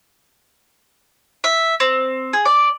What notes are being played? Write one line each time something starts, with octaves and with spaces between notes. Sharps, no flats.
E5
C4
G#4
D5